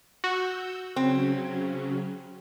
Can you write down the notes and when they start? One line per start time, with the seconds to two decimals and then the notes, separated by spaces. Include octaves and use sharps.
0.24 F#4 E6 G6
0.96 C#3 F#3 C4 C#4